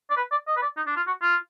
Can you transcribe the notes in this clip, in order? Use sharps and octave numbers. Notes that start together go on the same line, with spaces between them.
D5
B4
D5
D#5
B4
D5
D#4
D4
F4
F#4
F4